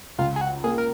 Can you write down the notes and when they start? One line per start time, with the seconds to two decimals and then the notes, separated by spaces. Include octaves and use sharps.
0.18 C#2 F4
0.36 G#4
0.41 F#4
0.64 A#3 G#4
0.78 A#4